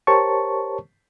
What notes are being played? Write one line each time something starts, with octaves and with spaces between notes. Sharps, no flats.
G4 A#4 C5 C#5 A5 C#6